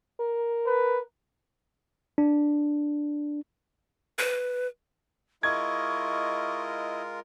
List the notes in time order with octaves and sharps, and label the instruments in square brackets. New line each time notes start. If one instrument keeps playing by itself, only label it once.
[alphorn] A#4
[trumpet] B4
[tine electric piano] D4
[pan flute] B4
[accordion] G#3 F4 A#4 [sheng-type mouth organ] E4 D#5 [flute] C#6 [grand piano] G#6